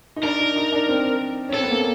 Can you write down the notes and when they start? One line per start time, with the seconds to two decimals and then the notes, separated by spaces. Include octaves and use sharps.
0.16 D#4
0.23 D4 A#4
0.40 D#4
0.56 D#4
0.72 D4
0.89 C4
1.49 C#4
1.54 C4 A4
1.63 B3
1.71 A#3